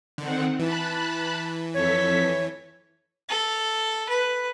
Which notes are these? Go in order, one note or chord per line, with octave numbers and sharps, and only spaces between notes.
D3 D#3 C4 F#5
E3 A5 B5 F#6
F2 A4 C#5 B6
A4
B4